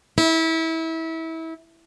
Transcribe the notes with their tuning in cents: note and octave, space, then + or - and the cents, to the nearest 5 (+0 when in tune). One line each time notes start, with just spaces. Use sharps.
E4 -25